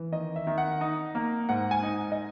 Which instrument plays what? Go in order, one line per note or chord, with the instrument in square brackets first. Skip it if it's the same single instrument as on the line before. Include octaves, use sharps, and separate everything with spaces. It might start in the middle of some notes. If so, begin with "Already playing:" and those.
Already playing: [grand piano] E3
D#3 D#5
E5
D#3
F#5
D#4
A#3
G#2 F#5
G#5
D#4
D#5